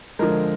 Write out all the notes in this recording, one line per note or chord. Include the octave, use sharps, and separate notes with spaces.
D3 F3 G#3 A#4